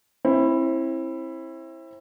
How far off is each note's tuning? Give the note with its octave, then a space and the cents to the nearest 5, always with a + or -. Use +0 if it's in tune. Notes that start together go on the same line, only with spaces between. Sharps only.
C4 +35 E4 +0